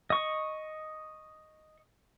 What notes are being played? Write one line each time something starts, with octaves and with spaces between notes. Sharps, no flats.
D#5 C#6